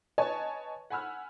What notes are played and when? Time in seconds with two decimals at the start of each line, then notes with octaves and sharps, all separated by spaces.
0.18 B4 C#5 D#5 G#5 A5
0.90 F#5 G#5 B5 E6 F6